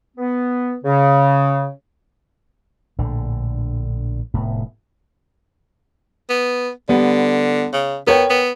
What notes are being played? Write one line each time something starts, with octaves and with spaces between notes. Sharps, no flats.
B3
C#3
A#1 A2 D3
F1 A2 B3
B3
D3 G3 B3
C#3
B3 A#4 C#5 G5
B3